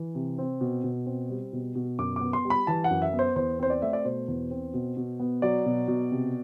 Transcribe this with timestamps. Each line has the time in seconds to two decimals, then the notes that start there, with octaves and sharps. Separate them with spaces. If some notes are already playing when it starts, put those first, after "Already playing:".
Already playing: E3
0.15 C3
0.38 C4
0.61 B2
0.84 B2
1.06 C4
1.29 G3
1.53 B2
1.75 B2
1.99 F#2 D6
2.16 D6
2.21 B3
2.33 C6
2.45 G3
2.50 B5
2.67 E3 A5
2.84 F#5
2.90 F#2
3.02 E5
3.13 B3
3.19 C5
3.36 E2 C5
3.59 C4 C5
3.70 D5
3.82 A3 E5
3.93 D5
4.05 B2 C5
4.28 E2
4.51 C4
4.74 B2
4.97 B2
5.20 B3
5.42 F#3 D5
5.66 B2
5.88 B2
6.11 C3